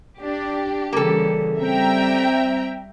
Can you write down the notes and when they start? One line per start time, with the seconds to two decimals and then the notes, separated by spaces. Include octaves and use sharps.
0.20 D4 G4
0.93 C#3 E3 G3 A#3 A4
1.61 G3 C4 E5 G5 A#5